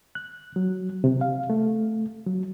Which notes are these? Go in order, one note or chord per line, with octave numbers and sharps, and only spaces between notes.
F#6
F#3
C3
F5
A3
F#3